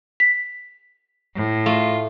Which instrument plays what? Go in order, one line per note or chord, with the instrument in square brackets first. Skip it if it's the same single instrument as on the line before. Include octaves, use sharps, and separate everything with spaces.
[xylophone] B6
[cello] A2
[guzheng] A3 [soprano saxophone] F4